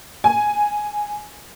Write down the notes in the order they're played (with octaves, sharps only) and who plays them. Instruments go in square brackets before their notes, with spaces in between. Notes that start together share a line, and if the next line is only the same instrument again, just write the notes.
[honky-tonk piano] G#5